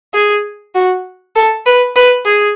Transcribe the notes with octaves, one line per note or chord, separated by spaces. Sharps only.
G#4
F#4
A4
B4
B4
G#4